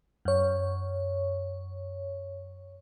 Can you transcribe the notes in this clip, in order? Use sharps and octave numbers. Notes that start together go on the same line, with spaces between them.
F#2 C#5